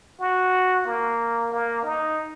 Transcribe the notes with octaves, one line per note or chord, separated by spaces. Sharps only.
F#4
A#3
A#3
D#4